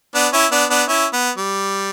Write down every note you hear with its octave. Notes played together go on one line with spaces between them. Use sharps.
B3 D4
C#4 E4
B3 D4
B3 D4
C#4 E4
B3
G3